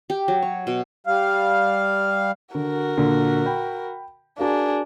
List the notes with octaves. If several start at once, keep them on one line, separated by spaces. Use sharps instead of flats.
G4
F#3
C#5
B2
G3 F5
D3 F#4 A#4
A#2 D3
G5 B5
D4 F#4 G#4 A#4 F5